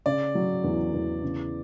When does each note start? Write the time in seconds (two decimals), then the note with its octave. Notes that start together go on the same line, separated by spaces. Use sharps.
0.06 C#3 D5
0.35 F#3
0.64 E2
0.93 E2
1.23 C#3